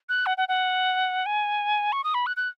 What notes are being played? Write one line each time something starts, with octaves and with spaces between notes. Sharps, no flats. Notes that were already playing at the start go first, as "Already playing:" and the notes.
F#6
F#5
F#5
F#5
G#5
C#6
D#6
B5
F#6
F#6